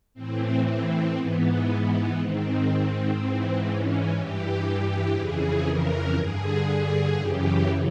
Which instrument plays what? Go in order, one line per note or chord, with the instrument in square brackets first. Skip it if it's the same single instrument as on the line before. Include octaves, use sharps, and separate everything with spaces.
[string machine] A2 E3 C4
C4
G#2 E3 B3
G#2 D#3 C4
G#2 E3
C#4
G2 E3 G4
F2 C#3 E3 G#4
A#4
G2 D3 G#4
F#2 C#3 E3 G4